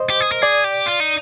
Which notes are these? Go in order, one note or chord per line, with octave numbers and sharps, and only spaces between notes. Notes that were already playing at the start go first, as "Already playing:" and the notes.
Already playing: C5 D#5
G4
G#4
A#4
G#4 D5
G4
F4
D#4